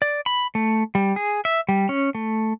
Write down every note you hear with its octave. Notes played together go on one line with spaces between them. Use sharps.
D5
B5
A3
G3
G#4
E5
G3
C#4
A3